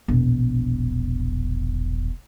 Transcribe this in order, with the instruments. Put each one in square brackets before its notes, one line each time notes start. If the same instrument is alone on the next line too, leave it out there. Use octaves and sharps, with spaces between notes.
[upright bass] E1 A#1